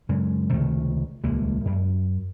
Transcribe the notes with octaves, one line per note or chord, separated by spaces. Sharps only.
F#2 C#3 G#3
C#2 C3 D#3 A3
D#1 C#2 G#3 A#3
F#2